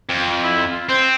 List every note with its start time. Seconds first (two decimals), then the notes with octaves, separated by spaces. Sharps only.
0.09 F2
0.43 E4
0.71 F4
0.89 C4 C5